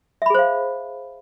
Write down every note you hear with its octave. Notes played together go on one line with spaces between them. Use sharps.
G#4 C5 E5 F5 B5